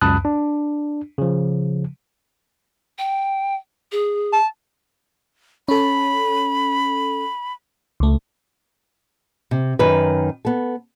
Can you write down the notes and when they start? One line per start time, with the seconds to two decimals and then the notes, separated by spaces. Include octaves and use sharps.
0.01 C#2 F#2 A5 B5 D#6 F#6
0.25 D4
1.18 C#3 F3
2.99 G5
3.92 G#4
4.32 A5
5.68 C#4 A4 B5
8.00 C#2 A3
9.51 C3
9.79 F#2 D#3 B4
10.45 B3 A4